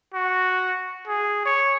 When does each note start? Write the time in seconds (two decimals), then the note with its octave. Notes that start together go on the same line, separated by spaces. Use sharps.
0.13 F#4
1.07 G#4
1.45 C#5